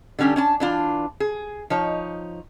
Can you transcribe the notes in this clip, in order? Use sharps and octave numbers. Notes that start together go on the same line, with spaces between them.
D3 G3 C#4 D4 G4
C#4 D4 A5
E3 D4 F4
G#4
F3 D#4 C#5